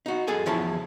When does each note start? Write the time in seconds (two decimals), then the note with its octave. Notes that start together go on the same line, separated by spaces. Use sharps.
0.06 D#4 F#4
0.27 F#2 G#4 A4 G#5
0.46 E2 C#3 F3 E4 C#5 A5